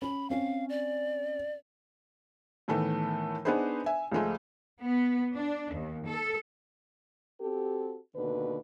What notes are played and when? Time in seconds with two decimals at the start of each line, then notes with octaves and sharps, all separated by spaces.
0.02 C#4 B5
0.30 C4 C#4 F5
0.69 D5
2.68 A2 D#3 E3 A3 B3
3.45 B3 D4 D#4 G#4 B4 C5
3.86 E5 G#5
4.12 C#2 F3 G#3 A3
4.82 B3
5.35 D4
5.73 D#2
6.06 A4
7.41 C4 F#4 G4 A4
8.16 D#2 B2 D3 B4